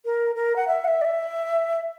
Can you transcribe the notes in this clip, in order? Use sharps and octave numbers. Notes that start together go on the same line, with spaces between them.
A#4
A#4
F#5
E5
F#5
E5
D5
E5